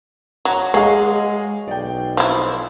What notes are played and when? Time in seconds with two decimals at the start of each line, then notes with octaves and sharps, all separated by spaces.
0.45 F#3 C#5 A#5
0.74 F#3 G#3 G#4 D#5 F5
1.68 B1 D5 G5
2.17 F3 E4